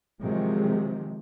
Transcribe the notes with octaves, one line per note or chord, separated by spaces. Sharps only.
C3 D#3 F3 F#3 G#3